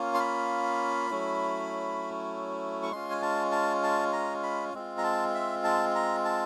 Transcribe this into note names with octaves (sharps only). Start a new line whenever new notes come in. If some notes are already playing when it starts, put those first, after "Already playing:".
Already playing: A#3 C#4 F4
C6
B5
F#3 A3 C#4 E4
C#6
G#3 C#4 F4 C6
G#5
A5
A5
A5
A#5
B5
G#3 C4 F4
A#5
A5
E5
A5
A#5
A5